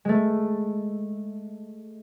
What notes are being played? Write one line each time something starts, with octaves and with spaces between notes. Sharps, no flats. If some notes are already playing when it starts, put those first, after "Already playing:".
G#3 A3